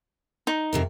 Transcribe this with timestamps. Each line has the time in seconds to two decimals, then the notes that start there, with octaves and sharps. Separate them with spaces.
0.47 D#4
0.73 F2 C3 A#4